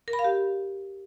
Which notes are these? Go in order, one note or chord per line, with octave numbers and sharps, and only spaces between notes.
A#4
B5
F5
G4